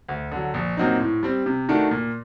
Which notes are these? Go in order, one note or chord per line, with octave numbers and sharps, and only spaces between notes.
D2
D3 F#3
A#1
A#2 F#3 C4 D#4
A2
G3 C4
C3
D#3 A3 D4 F#4
A#2